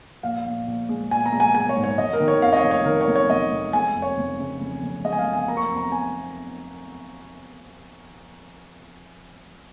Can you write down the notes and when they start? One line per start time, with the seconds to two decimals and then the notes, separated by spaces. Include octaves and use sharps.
0.23 A#1 F5
0.46 A#1
0.68 A#1
0.89 G#3
1.11 A#1 G#5
1.26 A#5
1.32 G#3
1.40 G#5
1.55 G#3 G#5
1.69 C#5
1.76 G#2
1.84 C#5
1.98 F1 D#5
2.13 A#4
2.20 D#3
2.28 C#5
2.42 F2 F5
2.53 D#5
2.57 C#5
2.64 F1
2.71 C#5
2.86 D#3 A#4
3.01 C#5
3.07 F1
3.16 C#5
3.30 F1 D#5
3.52 F1
3.73 G#3 G#5
3.95 F2
4.02 C#5
4.17 F1
4.39 C#3
4.60 F1
4.83 F1
5.04 G#3 D#5
5.13 G#5
5.19 F5
5.26 F1
5.33 G#5
5.48 A#3 A#5
5.57 C#6
5.63 A#5
5.70 F2
5.77 A#5
5.92 G#5